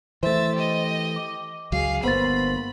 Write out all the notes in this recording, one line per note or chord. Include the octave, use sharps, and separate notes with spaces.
E3 A3 C5 E5 A6
G4 D#5
D6
C#2 F#3 G#4 F5
G1 A#3 B3 C5 B5 A6